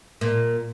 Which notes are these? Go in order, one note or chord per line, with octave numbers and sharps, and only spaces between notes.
A#2